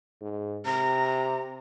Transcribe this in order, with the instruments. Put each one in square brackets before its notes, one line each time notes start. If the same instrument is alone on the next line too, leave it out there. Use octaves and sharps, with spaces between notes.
[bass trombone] G#2
[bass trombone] C3 [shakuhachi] A#5